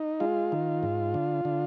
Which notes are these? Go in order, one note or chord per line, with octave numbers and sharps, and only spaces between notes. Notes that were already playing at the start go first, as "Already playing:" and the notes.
Already playing: D#4
G#3 F4
D#3
G#2
D3
D3